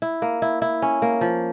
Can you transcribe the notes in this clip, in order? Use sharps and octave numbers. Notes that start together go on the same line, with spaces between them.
E4
A#3
E4
E4
C#4
A#3
F3